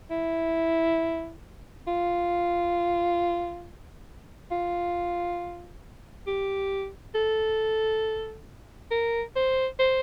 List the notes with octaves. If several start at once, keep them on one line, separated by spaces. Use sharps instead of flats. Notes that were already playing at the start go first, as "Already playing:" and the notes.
E4
F4
F4
G4
A4
A#4
C5
C5